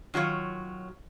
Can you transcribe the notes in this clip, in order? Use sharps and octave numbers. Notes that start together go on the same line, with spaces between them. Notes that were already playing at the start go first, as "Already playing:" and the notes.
D#3 F#3 F4 C#5